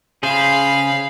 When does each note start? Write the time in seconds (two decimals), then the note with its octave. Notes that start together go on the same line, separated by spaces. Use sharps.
0.23 C#3 G#4 C5 F5 B5